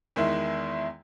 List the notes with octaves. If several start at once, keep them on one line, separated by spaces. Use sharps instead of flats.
E2 D#3 G#3 E4